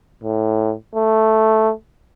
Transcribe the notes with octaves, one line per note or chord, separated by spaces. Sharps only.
A2
A3